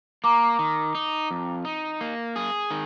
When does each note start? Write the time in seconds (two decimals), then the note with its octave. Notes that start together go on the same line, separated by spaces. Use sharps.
0.24 A#3 A#5 D6
0.59 D#3
0.95 D#4
1.31 F2
1.65 D#4
2.01 A#3
2.36 G#4
2.71 D#3